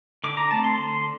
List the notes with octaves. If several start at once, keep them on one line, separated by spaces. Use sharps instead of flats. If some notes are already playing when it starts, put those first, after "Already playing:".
D3 D6
A#5
A3 C4 A5
C6
D3 C6